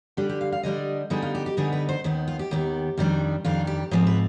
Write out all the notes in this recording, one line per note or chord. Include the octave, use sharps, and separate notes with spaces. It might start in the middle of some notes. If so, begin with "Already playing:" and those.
D3 G3 D4 G4
G4
F5
F5
D3 G3 D4 D#5
D3 G3 B3 D#4 G#4
F4
G4
G4
D3 G3 B3 D#4 G#4
B4
C5
D#2 D#3 B3
F4
G4
D#2 D#3 B3
F2 D#3 G3 D4
F2 D#3 G3 D4 F4
G4
G#2 F3 C4 G#4
B4